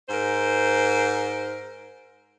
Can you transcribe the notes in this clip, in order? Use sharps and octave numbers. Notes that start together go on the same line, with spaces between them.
G#2 A#4 C5